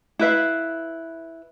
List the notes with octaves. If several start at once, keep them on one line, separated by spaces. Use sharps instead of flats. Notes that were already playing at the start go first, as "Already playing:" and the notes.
E4 B4 E5 F5